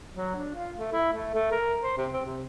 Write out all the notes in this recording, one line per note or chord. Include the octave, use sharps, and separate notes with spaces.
F#3
D4
F4
A3
E4
A3
A3
A#4
C5
C3
C4
C3